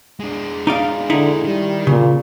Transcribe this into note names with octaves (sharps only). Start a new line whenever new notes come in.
G#3 D4
D#4 D5 F5
D3 D#4 E4
D#3 G3
A#2 C#3